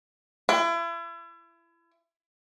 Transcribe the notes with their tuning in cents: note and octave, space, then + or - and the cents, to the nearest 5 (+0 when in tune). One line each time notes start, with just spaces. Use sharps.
E4 +35